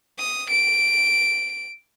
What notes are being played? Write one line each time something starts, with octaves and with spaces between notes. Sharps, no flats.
D#6
D7